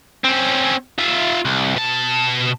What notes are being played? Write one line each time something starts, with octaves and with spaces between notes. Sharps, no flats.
C4 C#4
F4 E5
C2
B2 A5